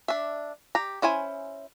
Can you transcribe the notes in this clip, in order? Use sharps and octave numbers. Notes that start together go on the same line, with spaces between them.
D4 E5
G4 A#5
C#4 E4 C5 G#5